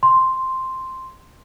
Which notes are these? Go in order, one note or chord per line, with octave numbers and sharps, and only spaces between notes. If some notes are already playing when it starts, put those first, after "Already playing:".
C6